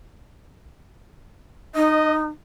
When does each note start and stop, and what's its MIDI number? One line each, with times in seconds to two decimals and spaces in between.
1.75 2.28 63
1.75 2.16 75